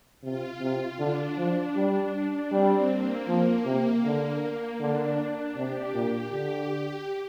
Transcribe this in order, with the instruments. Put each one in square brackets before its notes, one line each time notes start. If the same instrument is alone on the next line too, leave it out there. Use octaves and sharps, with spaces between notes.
[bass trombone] C3 [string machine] F4
[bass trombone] C3
[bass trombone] D3 [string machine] D4
[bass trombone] F3
G3
[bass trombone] G3 [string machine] C4
[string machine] A#3
[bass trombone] F3
C3
D3
[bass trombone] D3 [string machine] D4
[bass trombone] C3 [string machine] G4
[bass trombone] A#2
D3